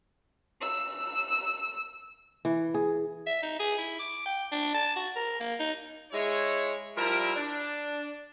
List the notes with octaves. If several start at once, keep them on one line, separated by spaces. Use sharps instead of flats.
E6
E3
G#4
E5
D#4
G#4
E4
D6
G5
D4
A5
F#4
A#4
A#3
D#4
G#3 E4 C#5
F3 G3 E4 A#4
D4